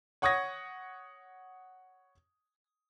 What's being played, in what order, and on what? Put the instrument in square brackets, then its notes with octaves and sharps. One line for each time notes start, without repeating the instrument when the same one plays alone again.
[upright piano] C#5 F#5 C#6 D#6 G#6 A#6